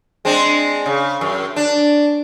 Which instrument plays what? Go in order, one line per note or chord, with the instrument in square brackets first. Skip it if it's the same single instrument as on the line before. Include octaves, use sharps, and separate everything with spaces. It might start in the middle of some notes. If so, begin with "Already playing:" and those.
[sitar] G#3 C4 D4
C#3
F#2
D4